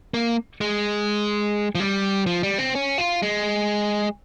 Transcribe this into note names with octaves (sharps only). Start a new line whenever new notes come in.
A#3
G#3
F3
G3
F3
G3
C4
C#4
F4
G#3